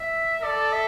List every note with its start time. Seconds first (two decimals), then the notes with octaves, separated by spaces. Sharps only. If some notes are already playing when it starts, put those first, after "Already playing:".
Already playing: E5
0.42 A4 D5
0.72 E5